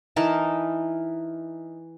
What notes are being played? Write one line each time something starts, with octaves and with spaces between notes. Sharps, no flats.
E3 D#4 A#4 A5